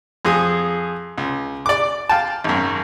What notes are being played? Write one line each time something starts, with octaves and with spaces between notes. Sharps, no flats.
F2 G#4 D#6
C#2
D5 D6
F5 G5 A5
G#1 F#2